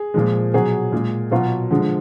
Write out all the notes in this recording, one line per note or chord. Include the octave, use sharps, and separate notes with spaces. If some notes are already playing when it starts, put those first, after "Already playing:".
Already playing: G#4
A#2 F3 G#3
B2 F#3 G#4
A#2 G#3
B2 F#3 F4
D3 F3 G#3